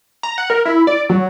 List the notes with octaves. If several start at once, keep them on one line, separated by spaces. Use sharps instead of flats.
A#5
F#5
A#4
E4
D5
F#3